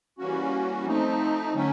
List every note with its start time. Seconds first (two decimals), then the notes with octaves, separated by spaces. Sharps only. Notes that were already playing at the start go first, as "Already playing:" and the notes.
0.18 E3 G3 A#3 C#4 F#4
0.86 F3 A3 C4 D#4
1.54 D3 F#3 A3 C#4